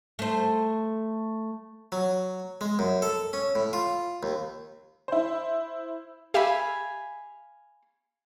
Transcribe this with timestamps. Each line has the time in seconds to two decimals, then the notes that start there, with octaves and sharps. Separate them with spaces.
0.19 A3 C5
1.92 F#3
2.61 G#3
2.79 F#2
3.02 A4
3.33 C#4
3.55 A2
3.73 F4
4.23 D#2
5.08 E4 C5
6.34 G4 E5 F5 G#5 B5